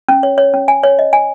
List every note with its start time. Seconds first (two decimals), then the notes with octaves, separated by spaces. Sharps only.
0.09 C#4
0.23 C#5
0.38 C#5
0.54 C#4
0.68 G#5
0.83 C#5
0.99 D#5
1.13 G#5